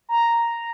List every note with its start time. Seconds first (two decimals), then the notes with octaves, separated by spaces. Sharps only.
0.09 A#5